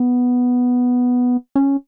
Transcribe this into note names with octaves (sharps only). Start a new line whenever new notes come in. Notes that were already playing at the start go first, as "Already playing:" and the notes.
Already playing: B3
C#4